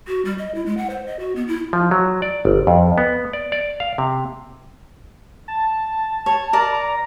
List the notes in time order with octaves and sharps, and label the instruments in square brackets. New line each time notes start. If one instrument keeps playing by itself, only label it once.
[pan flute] F#4
G3
D#5
E4
G#3
F#5
C5
D#5
F#4
B3
E4
[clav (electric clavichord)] F3
F#3
D5
G1
F2
B3
D5
D5
F5
C3
[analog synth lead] A5
[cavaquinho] C#5
A#4 D5
[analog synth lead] A#5